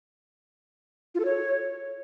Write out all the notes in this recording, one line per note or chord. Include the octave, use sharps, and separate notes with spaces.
F4
A4
C#5